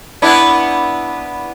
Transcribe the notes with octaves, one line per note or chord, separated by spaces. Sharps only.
B3 D4 E4